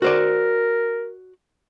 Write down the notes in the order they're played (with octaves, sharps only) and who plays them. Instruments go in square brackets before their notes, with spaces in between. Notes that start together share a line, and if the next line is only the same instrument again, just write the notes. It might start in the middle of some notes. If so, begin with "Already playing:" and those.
[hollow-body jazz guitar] F#4 C5 D5 [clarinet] A#4